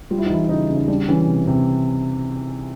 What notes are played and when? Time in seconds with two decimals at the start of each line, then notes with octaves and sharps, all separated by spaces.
0.10 G3 F4
0.19 E4
0.26 D#4
0.30 E3 E4
0.44 E4
0.49 C#3 D#4
0.69 C#3
0.77 D#4
0.88 G3 D4
1.08 E3 C#4
1.27 C3
1.47 C3